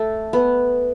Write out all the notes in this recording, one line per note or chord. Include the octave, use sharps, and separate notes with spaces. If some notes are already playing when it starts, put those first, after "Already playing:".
Already playing: A3
B3